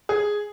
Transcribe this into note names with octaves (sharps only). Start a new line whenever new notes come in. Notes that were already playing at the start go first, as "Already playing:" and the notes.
G#4